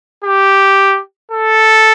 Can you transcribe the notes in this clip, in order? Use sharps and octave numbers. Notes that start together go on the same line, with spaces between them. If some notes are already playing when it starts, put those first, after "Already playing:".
G4
A4